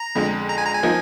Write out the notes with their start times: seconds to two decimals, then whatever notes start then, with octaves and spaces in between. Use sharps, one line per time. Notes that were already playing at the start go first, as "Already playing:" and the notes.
Already playing: A#5
0.15 F2 D3 G#3
0.49 A#5
0.58 G#5
0.66 A#5
0.74 G#5
0.83 F3 A#3 D#4